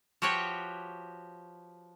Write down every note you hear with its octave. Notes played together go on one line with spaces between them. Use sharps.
F3 F#4 G4 B4 C#5